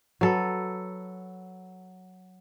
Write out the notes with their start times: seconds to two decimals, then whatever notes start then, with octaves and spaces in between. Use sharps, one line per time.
0.21 F#3 A4 B4